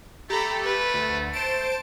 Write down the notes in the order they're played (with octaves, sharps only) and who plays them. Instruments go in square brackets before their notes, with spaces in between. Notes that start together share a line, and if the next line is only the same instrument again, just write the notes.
[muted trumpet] A3 [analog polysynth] G4 A4 [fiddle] A#5 B5
[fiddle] B4
[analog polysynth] D2
[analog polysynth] C5 D7 [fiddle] A5